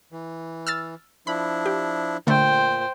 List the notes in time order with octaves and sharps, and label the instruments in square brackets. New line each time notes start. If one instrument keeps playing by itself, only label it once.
[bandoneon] E3
[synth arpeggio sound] E6 F6 A6
[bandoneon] F3 D4 E4 [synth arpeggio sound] B5
[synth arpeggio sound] G4
[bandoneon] A#2 [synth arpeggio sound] D3 A3 [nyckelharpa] C5 G5